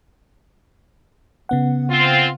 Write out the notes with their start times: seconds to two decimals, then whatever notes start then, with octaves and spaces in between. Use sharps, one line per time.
1.49 C#3 B3 F#5
1.90 C4 F4